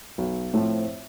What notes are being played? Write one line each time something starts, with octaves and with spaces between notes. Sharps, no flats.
B1
A2 F3 A3 C4